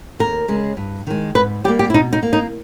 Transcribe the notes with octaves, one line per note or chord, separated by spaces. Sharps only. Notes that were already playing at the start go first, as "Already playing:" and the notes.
D#2 A#4
C#3 G#3
G2
D#3 G#3
G#2 B4
G3 A#3 G4
G4
E4
B2 D#4
D#4
A#3
D#4